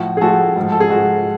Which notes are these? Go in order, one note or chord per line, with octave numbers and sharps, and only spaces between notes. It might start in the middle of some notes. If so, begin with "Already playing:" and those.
Already playing: A2 F3 F#4
G#4
A2 F3 F#4 A4
G#2 F3
A4
G#4
G#2 F3 F#4